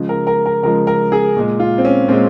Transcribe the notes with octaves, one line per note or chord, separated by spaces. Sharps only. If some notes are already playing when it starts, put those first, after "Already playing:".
Already playing: C#3 F3 G#3
A#4
A#4
A#4
C#3 F3 G#3 A#4
A#4
G#4
A#2 G#3
F4
C4
C#4
A#2 G#3 C4